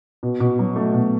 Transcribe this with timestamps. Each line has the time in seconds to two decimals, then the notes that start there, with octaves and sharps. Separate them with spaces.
0.23 B2
0.40 B2
0.59 F#3
0.76 A3
0.94 B2